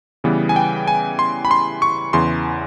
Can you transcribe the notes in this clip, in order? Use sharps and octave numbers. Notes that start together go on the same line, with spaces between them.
C#3 E3 G3 B3
G#5
G5
G#5
C6
B5
C6
C#6
E2 C#3 E3 C6